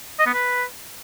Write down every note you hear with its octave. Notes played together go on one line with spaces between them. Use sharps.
D#5
B3
B4